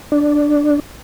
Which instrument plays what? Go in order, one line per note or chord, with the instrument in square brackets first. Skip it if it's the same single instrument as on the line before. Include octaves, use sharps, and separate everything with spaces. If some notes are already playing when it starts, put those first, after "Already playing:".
[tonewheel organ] D4